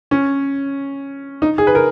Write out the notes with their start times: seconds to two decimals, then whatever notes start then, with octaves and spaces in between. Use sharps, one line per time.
0.11 C#4
1.42 D#4
1.58 G#4
1.67 B4
1.75 A#4